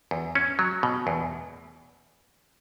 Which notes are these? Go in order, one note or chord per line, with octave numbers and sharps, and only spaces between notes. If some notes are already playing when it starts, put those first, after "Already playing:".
E2
C#4
F#3
B2
E2